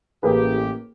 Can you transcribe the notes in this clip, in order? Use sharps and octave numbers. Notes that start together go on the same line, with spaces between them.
A1 A#3 G4 G#4 B4